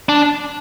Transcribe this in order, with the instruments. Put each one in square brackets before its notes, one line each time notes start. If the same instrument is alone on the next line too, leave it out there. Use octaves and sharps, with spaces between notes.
[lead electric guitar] D4